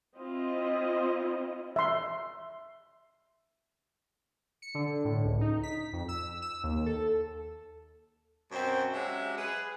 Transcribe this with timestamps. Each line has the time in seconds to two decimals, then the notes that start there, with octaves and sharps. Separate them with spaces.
0.17 C4 E4 F4 D#5
1.76 E5 C6
4.62 C#7
4.75 D3
5.05 A2
5.24 C#2
5.41 D#4
5.63 B6
5.93 F2
6.08 E6
6.42 E6
6.63 D#2
6.86 A4
8.52 F#2 B2 C4 C5
8.93 F#3 G#3 C#4 F#4 G4 E5
9.38 G#4 B4